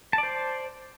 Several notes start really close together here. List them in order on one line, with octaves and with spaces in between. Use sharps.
A5 D5 C5